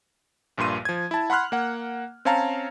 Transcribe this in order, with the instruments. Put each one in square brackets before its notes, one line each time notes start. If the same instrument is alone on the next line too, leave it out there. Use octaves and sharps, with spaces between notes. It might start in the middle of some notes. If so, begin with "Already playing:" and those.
[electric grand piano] A#1 G2 A#2 C6 D#7
F3 G#6
E4 A5
F#5 B5 C6 F6 F#6
A#3 F#5
C4 C#4 C#5 F5 A5 A#5